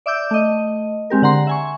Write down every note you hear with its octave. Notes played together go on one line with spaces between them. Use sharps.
D5 E5 D6 E6 G6
A3 D#5
G#3 C4 G4 A#4
D3 F#5 A#5 C6
E5 G#5 C#6